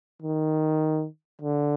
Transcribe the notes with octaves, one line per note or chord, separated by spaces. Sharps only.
D#3
D3